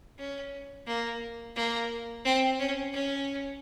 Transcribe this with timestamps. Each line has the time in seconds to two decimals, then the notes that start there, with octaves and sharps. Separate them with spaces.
0.18 C#4
0.87 A#3
1.56 A#3
2.25 C4
2.59 C#4
2.93 C#4